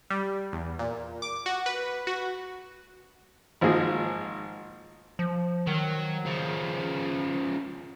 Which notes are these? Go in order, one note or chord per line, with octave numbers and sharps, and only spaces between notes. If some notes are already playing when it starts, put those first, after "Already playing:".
G3
E2
A#2
D6
F#4
B4
F#4
G#1 F3 A#3 G#4
F3
D#3 F#3
C#3 F3